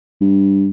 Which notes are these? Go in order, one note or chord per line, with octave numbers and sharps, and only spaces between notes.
G2